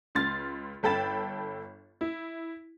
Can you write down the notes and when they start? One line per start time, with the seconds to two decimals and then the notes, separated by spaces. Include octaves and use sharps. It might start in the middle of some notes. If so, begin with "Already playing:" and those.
0.15 C#2 C6 F6 A6
0.83 G1 A4 G5 B5 A6 E7
2.01 E4